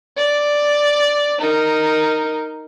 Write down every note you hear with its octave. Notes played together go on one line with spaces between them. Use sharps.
D5
D#4 A#4